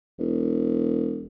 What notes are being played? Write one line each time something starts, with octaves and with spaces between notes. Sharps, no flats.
E1